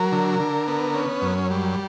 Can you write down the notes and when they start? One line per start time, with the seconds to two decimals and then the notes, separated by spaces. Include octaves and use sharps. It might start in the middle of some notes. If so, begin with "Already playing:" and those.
Already playing: F#3 A#4
0.12 D3
0.40 D3
0.68 B3
0.94 C#4
1.22 F#2
1.50 G3